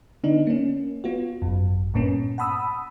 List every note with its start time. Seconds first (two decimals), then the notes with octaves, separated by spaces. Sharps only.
0.24 D3 B3 D4 D#4
0.47 A#3 C#4
1.04 B3 F4 F#4
1.42 G#1 F#2
1.94 G2 A#2 A#3 B3 C#4
2.38 F#5 A5 B5 D#6 E6